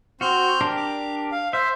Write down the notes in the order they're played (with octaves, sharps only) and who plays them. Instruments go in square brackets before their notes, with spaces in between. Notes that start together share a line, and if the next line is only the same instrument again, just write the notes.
[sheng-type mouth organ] C4 F6 G6 [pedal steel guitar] F#4
[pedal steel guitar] D4 G4 A#4
[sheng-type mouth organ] D6
F5
[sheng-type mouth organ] C5 [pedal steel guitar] E5